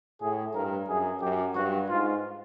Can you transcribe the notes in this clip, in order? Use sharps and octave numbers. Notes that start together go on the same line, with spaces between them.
A2 G#4
G2 A#4
F#2 G#4
F#2 G4
G2 F#4
G#2 F4